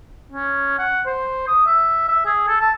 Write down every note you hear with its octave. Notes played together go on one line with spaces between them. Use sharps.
C#4
F#5
C5
D#6
E5
E5
G#4
A4
A5